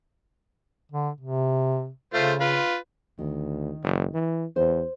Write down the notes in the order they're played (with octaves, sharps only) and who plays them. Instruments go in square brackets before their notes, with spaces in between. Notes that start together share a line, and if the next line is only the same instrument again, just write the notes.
[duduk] D3
C3
[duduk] C#3 [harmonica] A3 F4 C5
[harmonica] F4 B4
[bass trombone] D2 [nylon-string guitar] D#3
[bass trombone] F#1
E3
[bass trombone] E2 [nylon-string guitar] C5